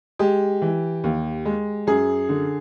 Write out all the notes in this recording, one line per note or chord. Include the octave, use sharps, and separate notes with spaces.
G#3 G4
E3
D#2
G#3
F#2 G#4
D3